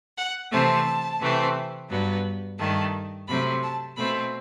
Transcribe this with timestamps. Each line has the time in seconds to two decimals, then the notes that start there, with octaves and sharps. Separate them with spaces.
0.17 F#5
0.50 C3 E3 A3 C4 A5
1.19 C3 E3 A3 C4
1.89 G2 F#3 B3
2.58 G2 D#3 A3 A5
3.27 C3 F#3 A3 C4 B5
3.62 A5
3.96 B2 A3 C4 B5